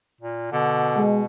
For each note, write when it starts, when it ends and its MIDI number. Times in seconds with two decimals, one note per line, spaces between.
0.21 0.49 46
0.52 1.25 47
0.52 1.03 50
0.97 1.22 56